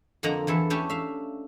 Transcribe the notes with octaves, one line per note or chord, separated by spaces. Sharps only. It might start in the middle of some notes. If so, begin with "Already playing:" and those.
F2 D3 A#3 D#5 F#5 A#5
E2 E3 A4 E5
A3 C#4 D4 G4 E5
E5 F5